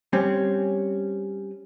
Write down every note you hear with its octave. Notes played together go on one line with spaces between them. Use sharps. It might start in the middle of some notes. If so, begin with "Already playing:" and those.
G3 C4 C#4